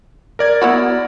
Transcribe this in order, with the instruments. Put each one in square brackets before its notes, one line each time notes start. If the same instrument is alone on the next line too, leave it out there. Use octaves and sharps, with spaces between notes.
[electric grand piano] A#4 D5 G#6
[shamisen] B3 E4 F#4